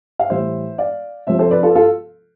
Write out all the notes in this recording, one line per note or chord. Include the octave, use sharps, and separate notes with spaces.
F5
A2 E3 G3 C5 E5
D5 F5
C3 F3 C5 E5
A4 C5
B4 D5
F4 A4
F4 A4